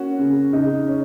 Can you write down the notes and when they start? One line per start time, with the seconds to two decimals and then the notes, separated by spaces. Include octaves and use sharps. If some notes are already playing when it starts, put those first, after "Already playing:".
Already playing: A#3 C#4 F#4
0.19 C#3
0.53 C#3 D#4
0.88 C#4